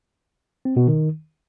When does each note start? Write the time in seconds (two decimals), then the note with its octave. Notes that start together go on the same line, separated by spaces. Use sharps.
0.65 C4
0.77 B2
0.88 D#3